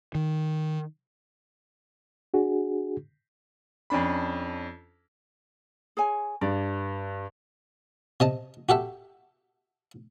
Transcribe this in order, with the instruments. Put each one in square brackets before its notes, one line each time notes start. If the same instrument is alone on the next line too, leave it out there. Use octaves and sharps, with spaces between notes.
[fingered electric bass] D#3
[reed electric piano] D4 F#4 G#4
[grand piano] F2 C#4 D4 B5
[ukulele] G#4 C#5 G#5
[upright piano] G2 [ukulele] D5
[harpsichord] C3 D#5 A5
F#4 G4 A4 E5